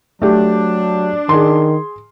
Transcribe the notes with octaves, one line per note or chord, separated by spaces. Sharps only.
F#3 A3 D4 G4
D#3 G#4 C6